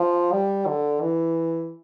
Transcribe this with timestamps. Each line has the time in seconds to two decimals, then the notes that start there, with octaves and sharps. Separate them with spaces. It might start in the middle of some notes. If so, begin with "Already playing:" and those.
Already playing: F3
0.32 G3
0.67 D3
1.01 E3